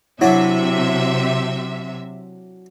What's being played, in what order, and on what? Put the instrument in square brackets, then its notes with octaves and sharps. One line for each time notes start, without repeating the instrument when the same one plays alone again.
[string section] C3 E5 [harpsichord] F#3 D4 [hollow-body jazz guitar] E4